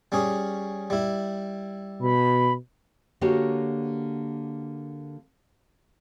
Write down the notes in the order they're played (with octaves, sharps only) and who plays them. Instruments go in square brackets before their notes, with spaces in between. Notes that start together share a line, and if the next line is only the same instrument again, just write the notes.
[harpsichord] G3 C#4 G#4
G3 E4
[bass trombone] B2 [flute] B5
[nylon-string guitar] D3 A#3 F#4 G4 A#4 C#5